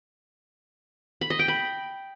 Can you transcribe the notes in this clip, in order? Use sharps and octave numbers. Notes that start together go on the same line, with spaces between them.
B5
D#5
G5
B5